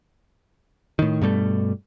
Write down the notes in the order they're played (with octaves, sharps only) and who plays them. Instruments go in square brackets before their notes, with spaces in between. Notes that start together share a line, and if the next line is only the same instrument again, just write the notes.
[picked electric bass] A2 D#3
G2 B2 G3 A3